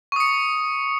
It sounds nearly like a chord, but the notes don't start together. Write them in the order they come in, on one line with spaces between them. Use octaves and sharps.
C#6 D#6 C#7